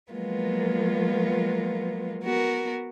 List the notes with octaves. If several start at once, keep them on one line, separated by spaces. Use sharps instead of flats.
F3 F#3 G#3 A#3 B3 F4
B3 F#4 A#4